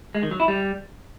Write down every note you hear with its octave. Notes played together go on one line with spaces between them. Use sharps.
G#3
D#3
F#3
E4
G3